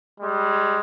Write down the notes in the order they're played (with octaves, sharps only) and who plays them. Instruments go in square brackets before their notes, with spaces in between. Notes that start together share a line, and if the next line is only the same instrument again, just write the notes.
[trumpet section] G3 G#3